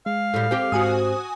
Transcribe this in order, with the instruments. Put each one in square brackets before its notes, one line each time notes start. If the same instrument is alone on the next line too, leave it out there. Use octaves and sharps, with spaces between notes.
[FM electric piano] G#3 [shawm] F5
[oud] A2 G3
C4 G4
[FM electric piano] G#2 [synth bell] F#4 G#5 D#6